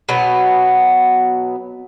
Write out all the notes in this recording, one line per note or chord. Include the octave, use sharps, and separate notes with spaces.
B2 F#3 B3